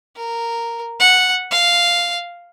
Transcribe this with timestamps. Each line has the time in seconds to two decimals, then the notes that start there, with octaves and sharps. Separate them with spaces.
0.16 A#4
1.00 F#5
1.51 F5